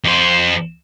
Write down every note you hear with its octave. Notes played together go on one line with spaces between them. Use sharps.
F2 C5